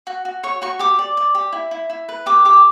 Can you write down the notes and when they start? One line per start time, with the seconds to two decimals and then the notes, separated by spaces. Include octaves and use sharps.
0.07 F#4
0.25 F#4
0.43 C#5 C#6
0.62 F#4 C#6
0.79 G4 D6
0.99 D5
1.17 D5
1.35 G4
1.53 E4
1.71 E4
1.90 E4
2.09 B4
2.26 G4 D6
2.45 G4 D6